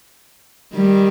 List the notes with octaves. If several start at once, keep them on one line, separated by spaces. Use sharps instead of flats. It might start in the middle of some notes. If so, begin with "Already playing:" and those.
D#3 G3